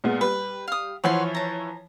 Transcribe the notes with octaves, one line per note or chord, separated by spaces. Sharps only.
A#2 G#3 B3
G3 B4
F5 D#6
E3 F3 B4 C#5 F#5 C6
A5 A#5